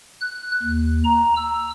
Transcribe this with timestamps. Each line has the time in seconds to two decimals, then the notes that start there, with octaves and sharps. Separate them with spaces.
0.21 F#6
0.63 D#2
1.05 A#5
1.36 E6